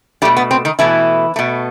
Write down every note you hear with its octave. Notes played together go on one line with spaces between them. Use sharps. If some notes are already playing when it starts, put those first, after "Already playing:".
B2 G3 A3 G4
B3
C4
D#3 D#4
B2 E3 A3 E4
B2 A3